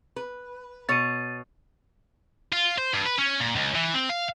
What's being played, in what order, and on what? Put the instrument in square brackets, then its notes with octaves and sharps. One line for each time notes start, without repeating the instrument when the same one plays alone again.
[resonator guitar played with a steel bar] B4
[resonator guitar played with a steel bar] B2 C#5 [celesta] A6 D#7
[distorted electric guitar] F4
C5
G2
B4
C#4
A#2
C#2
E3
C4
F5